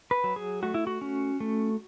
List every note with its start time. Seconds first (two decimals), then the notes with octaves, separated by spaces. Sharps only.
0.11 B4
0.24 F#3
0.36 G#4
0.63 A3 F#4
0.74 E4
0.87 F#4
1.01 C#4
1.40 A3